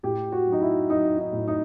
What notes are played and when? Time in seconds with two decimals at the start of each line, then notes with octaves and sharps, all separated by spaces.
0.03 A2 G4
0.32 F#4
0.47 F#3
0.52 D#4
0.61 E4
0.90 F#3 D#4
1.18 D#4
1.33 A2
1.48 D#4